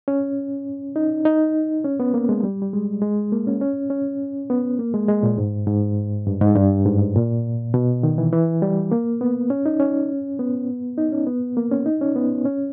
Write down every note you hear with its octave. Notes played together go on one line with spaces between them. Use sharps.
C#4
D#4
D#4
C#4
B3
A#3
G#3
G3
G3
G#3
G#3
A#3
C#4
C#4
C#4
B3
A#3
G#3
G#3
A#2
G#2
G#2
G2
G#2
G2
G#2
A#2
B2
D#3
E3
E3
G3
A#3
B3
C#4
D#4
C#4
B3
D#4
C#4
B3
A#3
C#4
D#4
C#4
B3
C#4